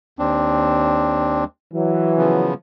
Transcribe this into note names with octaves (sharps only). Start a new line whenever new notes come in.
D#2 C4 D4
E3 F#3
C#3 F3 B3